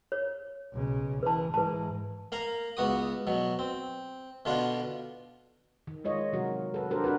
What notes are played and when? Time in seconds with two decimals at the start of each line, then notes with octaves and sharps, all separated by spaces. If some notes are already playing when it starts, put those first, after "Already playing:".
0.12 C#5
0.74 B1 C#3
1.23 E3 B4 A5
1.54 G#2 E3 B4 A5
2.32 A#3 F5 A#5
2.77 C#2 B3 F#4 D#6
3.27 B2 F#3
3.59 C4
4.45 B2 D3 B3 D4 F4
5.87 D#3
6.04 G#3 F4 C#5 D#5
6.32 C3 D#3 F#3 F#4 A#4
6.74 A4 B4
6.91 D4 F#4 G4 A4 A#4 C5
7.04 D4 F#4 A#4 B4